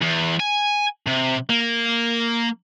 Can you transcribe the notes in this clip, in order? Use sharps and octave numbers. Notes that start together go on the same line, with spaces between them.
E2
G#5
C3
A#3